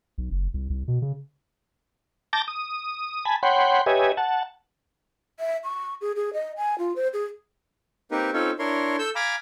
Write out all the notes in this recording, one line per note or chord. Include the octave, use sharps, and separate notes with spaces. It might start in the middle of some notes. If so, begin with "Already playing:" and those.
B1
F#1
C2
C2
B2
C#3
A5 D6 G6 A6 A#6
D#6
G#5 A5 B5
C#5 F#5 G5 B5 C6
G4 B4 C#5 D#5 E5 G#5
F#5 A5
E5
C#6
G#4
G#4
D#5
G#5
F4
C5
G#4
A#3 C4 D#4 G4 A#4 B4
C4 C#4 D#4 F4 A4 C#5
D4 E4 A#4 C#5 C6
A4 E6 G6
F5 G#5 A#5 B5 D6